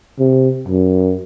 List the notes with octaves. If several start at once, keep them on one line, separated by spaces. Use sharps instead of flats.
C3
F#2